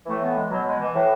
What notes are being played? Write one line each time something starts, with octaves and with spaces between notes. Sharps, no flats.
A2 E3 A3
B3
G#3
B2 F#3
G#3
E3
A2 E3